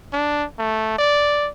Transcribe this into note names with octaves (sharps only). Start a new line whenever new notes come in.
D4
A3
D5